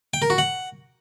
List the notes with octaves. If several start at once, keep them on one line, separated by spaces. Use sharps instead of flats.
G5
A#4
F#4
F#5